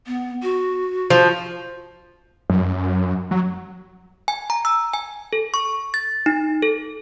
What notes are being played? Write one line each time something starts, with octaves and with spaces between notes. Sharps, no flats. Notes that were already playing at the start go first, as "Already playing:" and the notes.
B3
F#4
F3
F#2
F#3
G#5
A#5
E6
G#5
A4
C#6
A6
D#4
A4